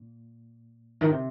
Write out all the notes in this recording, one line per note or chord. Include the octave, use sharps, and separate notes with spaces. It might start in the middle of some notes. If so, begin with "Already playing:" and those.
Already playing: A#2
D#3
C3